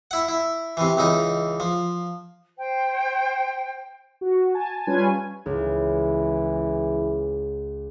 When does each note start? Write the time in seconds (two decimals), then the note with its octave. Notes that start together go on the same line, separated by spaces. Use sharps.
0.11 E4 F#5
0.29 E4
0.77 C3 E3
0.97 C#2 E3 D#4
1.60 F3
2.57 C5 G5
4.21 F#4
4.54 G#5 A5
4.87 G3 C#4 F4 B4 G#5
5.46 C#2 E3